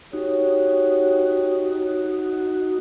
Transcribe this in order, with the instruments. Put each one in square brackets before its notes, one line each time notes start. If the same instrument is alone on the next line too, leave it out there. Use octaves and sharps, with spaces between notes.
[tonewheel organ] D#4 F#4 [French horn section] G4 C#5